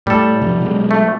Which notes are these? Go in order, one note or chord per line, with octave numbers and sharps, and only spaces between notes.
A2 G3 A3 A4
C3 F3
B2 F#3 G#3
A3